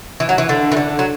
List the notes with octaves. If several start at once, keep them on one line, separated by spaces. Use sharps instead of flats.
E3
F#3
E3
D3
E3
D3
F#3